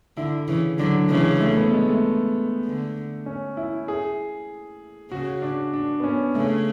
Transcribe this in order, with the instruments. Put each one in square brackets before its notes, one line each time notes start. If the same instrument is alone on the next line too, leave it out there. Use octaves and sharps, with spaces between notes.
[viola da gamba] D3 [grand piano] E4
[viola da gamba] C#3 E3
[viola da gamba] D3 F#3 [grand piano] D4
[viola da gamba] C#3 E3 [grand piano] G#3
[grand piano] A3
B3
G#3
A3
[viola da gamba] D3
[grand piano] C#4
E4
G#4
[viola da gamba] C#3 [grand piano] F#4
[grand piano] D4
D4
B3
C#4
[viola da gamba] C#3 [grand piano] A3